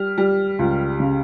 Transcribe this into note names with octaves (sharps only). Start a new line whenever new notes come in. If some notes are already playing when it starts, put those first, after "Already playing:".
Already playing: G3 F6
G3
C#2
C#3